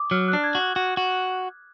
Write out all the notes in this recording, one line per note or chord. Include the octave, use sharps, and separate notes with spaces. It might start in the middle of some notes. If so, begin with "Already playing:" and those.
Already playing: D6 D#6
F#3 F6
F#6
D4
G#6
F#4
F#6
F#4
F#4